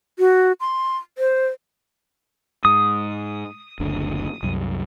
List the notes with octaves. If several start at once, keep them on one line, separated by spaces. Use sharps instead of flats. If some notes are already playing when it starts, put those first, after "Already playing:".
F#4
C6
C5
G#2 D#6
F#1 D2 D3
C2 F#2